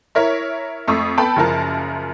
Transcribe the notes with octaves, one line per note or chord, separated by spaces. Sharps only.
E4 A#4 C#5 E5
F2 A3 C#6 D#6 E6
B3 A4 G5 A5 B5
F#1 F#2 F3 A#4 A5